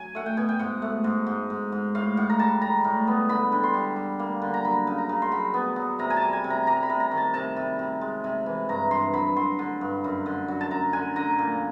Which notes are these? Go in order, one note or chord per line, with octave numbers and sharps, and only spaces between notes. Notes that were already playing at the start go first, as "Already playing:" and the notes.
Already playing: F#3 G#5
A3 F#5
G5
B2 G#5
G5
G#2 F#5
A3
G#2
G#2
G#2
G#2
A2 F5
A2 F#5
A#5
G3 A5
G3 A#5
A2
B3
D3 B5
D3
C6
G3
G3
A#3
D3
A#5
F#3 B5
C#3
A#5
C#3
C6
F#3 B5
B3
F#3
C3 A#5
G#5
A5
G3
G#5
C3
A#5
G3 A#5
B5
C3
A#5
D#3
A5
C3 A5
C3
C3
G#3
C3
E3
G2 A#5
G2 C6
F#3 B5
F#3 C6
D3
G2
F#2
D3
F#3
A5
F#2 A#5
D3 G#5
D3 A#5
A#2